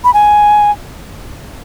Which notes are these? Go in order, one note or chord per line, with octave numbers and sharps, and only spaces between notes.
B5
G#5